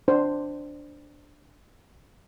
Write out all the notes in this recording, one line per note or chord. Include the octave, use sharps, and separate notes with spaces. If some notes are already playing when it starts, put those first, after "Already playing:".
D4 C5